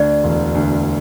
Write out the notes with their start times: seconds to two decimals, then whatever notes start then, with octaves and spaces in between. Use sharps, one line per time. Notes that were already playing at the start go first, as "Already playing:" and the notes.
Already playing: D2 D5
0.24 E1
0.55 D2